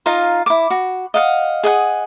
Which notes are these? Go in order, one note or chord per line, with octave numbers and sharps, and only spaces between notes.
D#4 F4 F5 A#5
E4 D6
F#4
D#5 F5 F#5
G#4 D#5 F#5